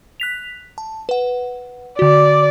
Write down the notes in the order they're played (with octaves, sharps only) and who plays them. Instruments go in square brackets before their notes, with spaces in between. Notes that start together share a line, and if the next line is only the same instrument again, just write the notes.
[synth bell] F#6 B6 F7
A5
B4 F#5
[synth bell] D3 F#4 [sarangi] D5